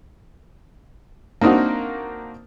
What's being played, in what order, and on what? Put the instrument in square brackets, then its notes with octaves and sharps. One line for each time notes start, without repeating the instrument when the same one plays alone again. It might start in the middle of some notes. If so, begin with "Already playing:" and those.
[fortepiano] A#3 C4 D4 D#4 F#4